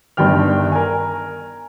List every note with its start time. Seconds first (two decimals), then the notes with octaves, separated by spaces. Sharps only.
0.17 G1 G2 D#3 G5 F6
0.72 A#4 G#5